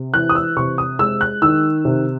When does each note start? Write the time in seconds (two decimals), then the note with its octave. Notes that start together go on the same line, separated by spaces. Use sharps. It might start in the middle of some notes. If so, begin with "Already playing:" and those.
Already playing: C3
0.14 E3 F#6
0.29 D#6
0.35 E6
0.57 C3 C#6
0.78 D#6
0.99 G#3 E6
1.21 F#6
1.42 D#3 E6
1.85 C3